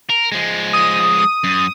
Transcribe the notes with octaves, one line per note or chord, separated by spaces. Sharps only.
A#4
F3 G#3
D#6
F#2